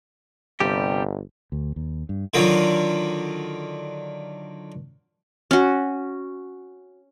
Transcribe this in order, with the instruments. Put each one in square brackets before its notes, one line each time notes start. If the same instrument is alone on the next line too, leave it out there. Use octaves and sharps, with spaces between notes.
[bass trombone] G1 [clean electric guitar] C3 G3 G4
[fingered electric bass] D2
D#2
G2
[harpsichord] D3 D#3 F#3 F4
[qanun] C#4 F#4